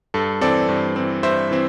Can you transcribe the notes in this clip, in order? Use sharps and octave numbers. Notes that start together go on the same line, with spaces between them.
G2 A4
E3 C4 A4 D5
G2
E3 C4
G2 C5 E5
E3 C4